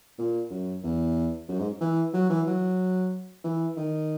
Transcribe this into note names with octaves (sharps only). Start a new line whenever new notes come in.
A#2
F#2
E2
F#2
G#2
E3
F#3
E3
F#3
E3
D#3